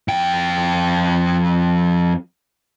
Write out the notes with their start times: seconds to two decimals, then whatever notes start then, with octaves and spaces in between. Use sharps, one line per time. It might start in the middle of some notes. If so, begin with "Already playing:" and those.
0.08 F2 G5